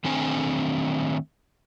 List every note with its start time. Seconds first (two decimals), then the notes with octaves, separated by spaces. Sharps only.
0.05 D#3 A3 C4 D4 G#5